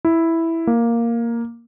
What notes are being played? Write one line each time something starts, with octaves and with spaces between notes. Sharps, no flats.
E4
A#3